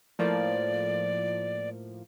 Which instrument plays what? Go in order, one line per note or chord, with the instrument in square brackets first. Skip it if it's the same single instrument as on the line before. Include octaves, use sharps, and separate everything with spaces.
[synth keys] A2 F3 A#3 [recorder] D5